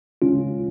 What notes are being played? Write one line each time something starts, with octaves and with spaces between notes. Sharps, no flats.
C#3 G#3 C#4 F4